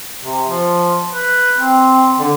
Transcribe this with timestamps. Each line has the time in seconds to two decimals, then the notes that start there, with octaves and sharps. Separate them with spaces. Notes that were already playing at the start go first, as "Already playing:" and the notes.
0.24 C3
0.47 F3
1.13 B4
1.57 C4
2.19 D3